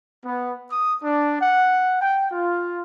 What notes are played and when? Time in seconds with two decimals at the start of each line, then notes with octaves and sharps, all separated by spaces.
0.23 B3
0.69 D#6
1.02 D4
1.40 F#5
1.99 G5
2.29 F4